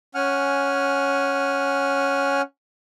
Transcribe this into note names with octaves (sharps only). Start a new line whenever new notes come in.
C#4 F#5 G#5 F6